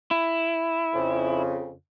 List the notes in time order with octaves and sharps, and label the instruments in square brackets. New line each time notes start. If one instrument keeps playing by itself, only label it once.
[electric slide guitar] E4
[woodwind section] F2 C#3